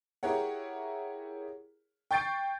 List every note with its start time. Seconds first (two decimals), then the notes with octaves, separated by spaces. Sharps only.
0.23 E4 G4 G#4 A#4 C#5 F#5
2.11 G5 C#6 G6 A6 C7 D7